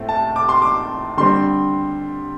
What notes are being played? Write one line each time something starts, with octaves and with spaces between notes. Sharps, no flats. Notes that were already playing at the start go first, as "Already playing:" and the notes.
Already playing: A2 A3 C4
A5
D6
C6
D6
D3 G3 C4 C6